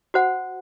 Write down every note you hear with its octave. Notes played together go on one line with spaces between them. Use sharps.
F#4 C5 F#5